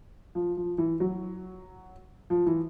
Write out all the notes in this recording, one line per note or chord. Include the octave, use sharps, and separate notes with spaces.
F3
F3
E3
F#3
F3
E3